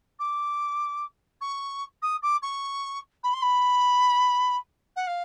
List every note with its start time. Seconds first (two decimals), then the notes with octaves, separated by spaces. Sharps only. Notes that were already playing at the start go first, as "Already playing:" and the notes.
0.19 D6
1.41 C#6
2.02 D#6
2.23 D6
2.42 C#6
3.23 B5
3.33 C6
3.42 B5
4.96 F#5
5.07 F5